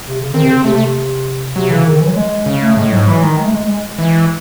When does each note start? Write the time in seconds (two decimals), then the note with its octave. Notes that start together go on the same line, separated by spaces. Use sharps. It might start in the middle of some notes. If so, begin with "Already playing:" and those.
0.09 C3
0.21 C#3
0.34 D#3 C4
0.44 C3
0.49 C#3
0.64 C3 A3
0.75 A3
0.79 C3
1.56 C3 F#3
1.70 C#3 E3
1.85 D#3
1.96 D#3
2.01 E3
2.06 F#3
2.16 G#3
2.46 C#3
2.62 A3
2.77 A2 G#3
2.92 G#2 F#3
3.08 E3 F#3
3.22 D#3 G#3
3.38 G#3
3.45 A3
3.51 G#3
3.68 G#3
3.99 E3